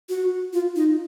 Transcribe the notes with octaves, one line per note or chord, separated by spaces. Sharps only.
F#4
F4
D#4